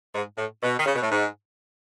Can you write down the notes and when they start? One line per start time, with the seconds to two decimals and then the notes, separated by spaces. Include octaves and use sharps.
0.15 G#2
0.38 A2
0.63 B2
0.79 D#3
0.86 C#3
0.95 B2
1.02 A2
1.10 G#2